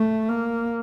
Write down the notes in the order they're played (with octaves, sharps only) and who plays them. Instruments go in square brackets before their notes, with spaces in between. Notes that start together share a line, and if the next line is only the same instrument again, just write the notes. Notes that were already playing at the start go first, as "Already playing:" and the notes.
Already playing: [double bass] A3
A#3